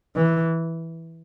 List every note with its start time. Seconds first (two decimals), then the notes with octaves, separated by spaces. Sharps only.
0.16 E3